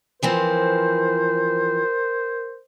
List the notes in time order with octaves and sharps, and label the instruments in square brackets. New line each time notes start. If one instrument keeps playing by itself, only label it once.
[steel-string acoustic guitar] E3 F3 C4 [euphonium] A#4 [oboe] C5